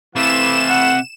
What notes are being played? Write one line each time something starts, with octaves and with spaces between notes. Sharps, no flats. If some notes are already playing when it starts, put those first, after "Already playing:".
C3 E3 A3 F5 E7
F#5